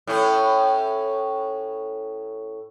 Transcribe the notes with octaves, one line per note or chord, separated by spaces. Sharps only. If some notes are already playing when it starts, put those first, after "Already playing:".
A2 C#4